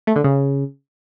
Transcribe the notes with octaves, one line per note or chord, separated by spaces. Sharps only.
A3
D3
C#3